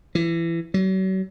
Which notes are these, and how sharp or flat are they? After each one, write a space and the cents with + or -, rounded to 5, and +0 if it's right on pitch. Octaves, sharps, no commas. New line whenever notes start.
E3 +25
F#3 +40